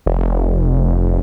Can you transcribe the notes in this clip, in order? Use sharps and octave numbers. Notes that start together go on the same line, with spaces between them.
F1